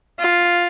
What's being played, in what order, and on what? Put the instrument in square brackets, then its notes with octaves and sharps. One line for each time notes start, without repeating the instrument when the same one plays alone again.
[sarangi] F4